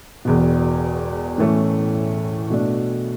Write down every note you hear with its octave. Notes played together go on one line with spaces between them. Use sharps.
E1 E2 B2
A2 E3 A3 C#4
B2 A3 D4